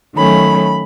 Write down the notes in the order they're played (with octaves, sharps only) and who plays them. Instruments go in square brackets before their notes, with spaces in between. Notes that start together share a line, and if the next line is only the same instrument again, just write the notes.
[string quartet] D#3 F#3 A3 C#4 B5